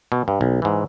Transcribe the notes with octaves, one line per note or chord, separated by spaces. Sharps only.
B2
G2
B1
G#2 E3